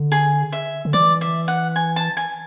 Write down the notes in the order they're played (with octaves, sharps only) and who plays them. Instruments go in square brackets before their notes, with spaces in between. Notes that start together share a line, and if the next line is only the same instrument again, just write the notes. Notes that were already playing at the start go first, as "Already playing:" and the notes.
Already playing: [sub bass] D3
[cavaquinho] G#4
E5
[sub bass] D3
[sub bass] E3 [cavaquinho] D5
[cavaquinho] E5
F#5
G#5
A5
G#5